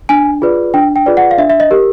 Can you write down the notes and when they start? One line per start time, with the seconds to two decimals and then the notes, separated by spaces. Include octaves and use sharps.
0.09 D4 G#5
0.42 F4 G#4 B4 D5
0.74 D4 G5
0.96 G5
1.06 F4 G#4 B4 D5
1.17 F#5
1.31 F5
1.38 D4 E5
1.50 E5
1.60 D#5
1.71 G4 A#4